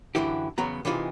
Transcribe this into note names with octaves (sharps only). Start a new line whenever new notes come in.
F#2 A#2 D3 E3 E4 G4
E2 C#3 F#3 B3 A#5
C3 E3 D#4 F4 G4 G#4